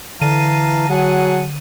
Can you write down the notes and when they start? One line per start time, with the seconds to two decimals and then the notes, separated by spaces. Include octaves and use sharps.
0.21 D3 E3 F5 A5 A#5 D#7
0.90 F#3 G#4 F#5 A5